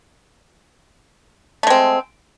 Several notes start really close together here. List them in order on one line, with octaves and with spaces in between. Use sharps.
A3 G#3 C4